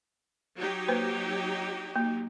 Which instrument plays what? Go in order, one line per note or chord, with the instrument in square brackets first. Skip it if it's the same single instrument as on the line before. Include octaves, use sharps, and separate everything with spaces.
[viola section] F#3 D#4 G4
[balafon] A#3 B4 C5
A#3